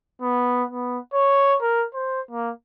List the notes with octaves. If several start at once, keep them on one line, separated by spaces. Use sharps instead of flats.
B3
B3
C#5
A#4
C5
A#3